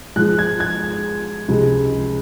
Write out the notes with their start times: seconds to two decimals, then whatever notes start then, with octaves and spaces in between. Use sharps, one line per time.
0.16 G#2 F3 G#3 F#6
0.39 G#6
0.60 G#6
1.48 C#2 C3 F3 G#3